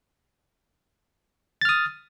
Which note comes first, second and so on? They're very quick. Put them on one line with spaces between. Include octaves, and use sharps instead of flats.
A6 F6 D#6